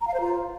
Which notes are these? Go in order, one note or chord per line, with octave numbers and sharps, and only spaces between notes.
A#5
F5
C5
F4